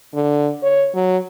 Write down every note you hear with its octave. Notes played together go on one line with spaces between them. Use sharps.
D3
C#5
F#3